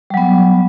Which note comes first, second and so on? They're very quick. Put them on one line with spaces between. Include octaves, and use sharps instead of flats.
G3 F#3 B3